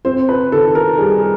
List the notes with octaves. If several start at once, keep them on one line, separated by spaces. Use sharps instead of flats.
C4 C5
B4
D#3 A4
A#4
G3 G#4